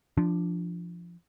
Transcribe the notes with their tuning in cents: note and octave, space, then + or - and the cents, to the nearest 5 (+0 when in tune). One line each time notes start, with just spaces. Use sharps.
F3 -15 D4 +0